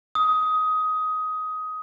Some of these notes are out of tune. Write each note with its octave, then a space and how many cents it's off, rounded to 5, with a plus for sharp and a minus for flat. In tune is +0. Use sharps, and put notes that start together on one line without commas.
D#6 +15